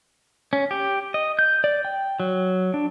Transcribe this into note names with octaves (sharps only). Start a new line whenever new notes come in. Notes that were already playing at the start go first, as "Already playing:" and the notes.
C#4
G4
D#5
G6
D5
G5
F#3
D4